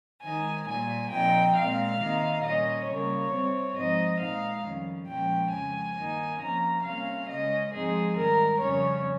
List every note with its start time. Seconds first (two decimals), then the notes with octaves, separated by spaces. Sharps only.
0.22 D#3 G#3 D#4 G#5
0.66 A#2 G3 A#3 G#5
1.10 A#2 F3 C4 D#4 G5
1.54 A#2 G#3 C4 F5
1.99 C3 D#3 A#3 D#4
2.42 A#2 G3 C#4 D#5
2.86 C#3 G3 A#3 C#5
3.31 C3 G3 C4
3.75 G#2 F3 C4 D#4 D#5
4.18 A#2 G#3 D#4 F5
4.63 F2 D#3 G3 C#4
5.07 A#2 F3 G#3 C#4 G5
5.51 F2 C#3 G#3 G#5
5.96 G2 D#3 A#3 D#4
6.39 C3 F3 A#3 C#4 A#5
6.83 C3 G3 A#3 C#4 F5
7.27 C#3 G#3 C#4 D#5
7.71 G#2 F3 G#3 C4 D#4 G#4
8.15 G#2 D#3 G3 A#4
8.59 F2 C#3 G3 C#4 C#5